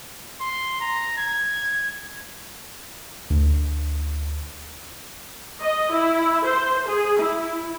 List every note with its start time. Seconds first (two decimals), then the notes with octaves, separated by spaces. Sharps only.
0.41 C6
0.81 A#5
1.18 G#6
3.30 D2
5.61 D#5
5.90 E4
6.45 C5
6.87 G#4
7.19 E4